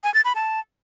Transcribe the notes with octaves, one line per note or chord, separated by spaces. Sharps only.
G#5
A6
B5
A5